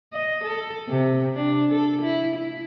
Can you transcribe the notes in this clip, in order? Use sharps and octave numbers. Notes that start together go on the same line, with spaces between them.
D#5
A4
C3
D4
A4
E4
E4